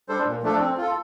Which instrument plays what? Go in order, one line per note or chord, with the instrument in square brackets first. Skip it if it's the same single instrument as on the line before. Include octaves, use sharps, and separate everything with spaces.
[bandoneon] G3 D4 A4 C5
A#2
F3 A3 D4 A4
C4
F4 A4